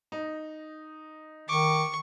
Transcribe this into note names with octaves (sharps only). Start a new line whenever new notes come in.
D#4
D#3 C#6 D6